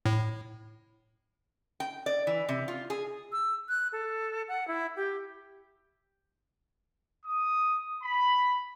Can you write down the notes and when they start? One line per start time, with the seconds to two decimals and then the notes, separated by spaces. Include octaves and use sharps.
0.06 A2
1.80 G5
2.06 D5
2.27 E3
2.49 C3
2.68 F4
2.90 G#4
3.32 E6
3.69 F#6
3.92 A4
4.48 F#5
4.68 E4
4.96 G4
7.25 D#6
8.03 B5